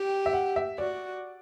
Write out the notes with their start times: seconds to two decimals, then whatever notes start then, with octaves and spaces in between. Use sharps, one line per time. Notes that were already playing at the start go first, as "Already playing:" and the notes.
Already playing: G4 G5
0.26 E5
0.33 F#5
0.56 E5
0.78 F#4 D5